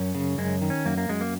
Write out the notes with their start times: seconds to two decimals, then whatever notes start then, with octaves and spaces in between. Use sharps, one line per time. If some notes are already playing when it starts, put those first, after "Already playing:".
Already playing: F#2 C#4
0.15 C#3
0.38 F#2 G#3
0.62 D#3
0.70 C#4
0.86 F#2 A#3
0.98 A#3
1.09 F#2 G#3
1.21 A#3